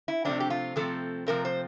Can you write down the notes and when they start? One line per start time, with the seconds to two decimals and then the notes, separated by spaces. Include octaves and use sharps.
0.08 E4
0.25 C3 F3 A3 C4 D4
0.40 G4
0.50 F4
0.76 C3 F3 A3 C4 A4
1.26 C3 F3 A3 C4 A#4
1.45 C5